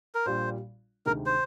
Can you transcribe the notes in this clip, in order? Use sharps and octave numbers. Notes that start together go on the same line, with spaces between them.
A#4
A#1 A#2 G3 C5
D2 C3 D#3 G#3 A#4
C5